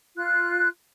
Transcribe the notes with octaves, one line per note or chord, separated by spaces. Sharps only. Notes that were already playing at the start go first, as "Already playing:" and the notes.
F4 F#6